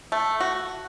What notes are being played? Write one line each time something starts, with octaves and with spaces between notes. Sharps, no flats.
A3
F#4